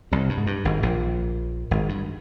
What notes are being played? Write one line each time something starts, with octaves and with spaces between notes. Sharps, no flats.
C2 C3
G2
G#2
G2
G#1 G#2
A#1 A#2
G#1 G#2
G2